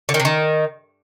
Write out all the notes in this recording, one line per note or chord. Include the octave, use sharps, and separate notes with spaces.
D3
D#3
C3
D#3